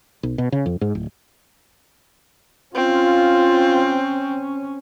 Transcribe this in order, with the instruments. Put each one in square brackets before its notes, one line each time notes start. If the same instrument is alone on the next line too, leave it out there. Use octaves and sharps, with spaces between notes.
[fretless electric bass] B1
B2
C#3
F2
G#2
D1
[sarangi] C4 [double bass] C#4 [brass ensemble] F4